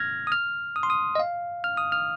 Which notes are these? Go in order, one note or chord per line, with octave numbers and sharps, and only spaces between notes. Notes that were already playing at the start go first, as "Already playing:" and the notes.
Already playing: F6 G#6 A#6
D#6
F6
D#6
C6
D#6
D#5
F5
F6
D#6
F6